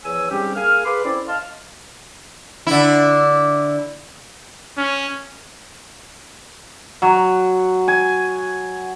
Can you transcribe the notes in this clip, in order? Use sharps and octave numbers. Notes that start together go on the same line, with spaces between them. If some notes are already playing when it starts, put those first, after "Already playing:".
E2 F3 C#5 G#5 E6
G#2 G3 C4 C#4 G4
A#3 G#4 F5 G#5 F6
G#4 B4 F5 B5 C6 D6
C4 C#4 E4 A4 D5
D#5 F5 A5 C6 F6
D3 E4
C#4
F#3
G#5